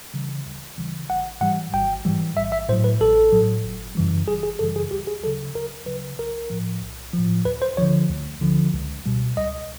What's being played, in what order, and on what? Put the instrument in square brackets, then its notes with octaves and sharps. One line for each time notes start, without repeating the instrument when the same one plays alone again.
[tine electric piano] C#3 E3 G3
D2
C#3 E3 G3
G#1 F#5
G#2 E3 G3 F#5
G#1 G5
G#2 E3 G3
A1 E5
E5
A2 C5
F#3
B4
A1 A4
A2 F#3
G1
F#2 C#3 E3 G3
G1 G#4
G#4
F#2 C#3 E3 G3 A4
G#4
D2 G4
G#4
F#3 A4
C#3
D2 A#4
C#3 F#3 B4
B1 A#4
A2 F3
B1
A2 F3
D2 B4
C5
D3 F3 C#5
D2
D3 F3
C#2
B2 G3
C#2 D#5